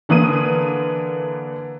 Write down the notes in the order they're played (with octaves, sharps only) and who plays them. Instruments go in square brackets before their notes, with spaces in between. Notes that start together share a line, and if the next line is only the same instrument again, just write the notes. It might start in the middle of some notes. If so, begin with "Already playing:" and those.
[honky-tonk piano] D3 E3 A#3 D#6 D#7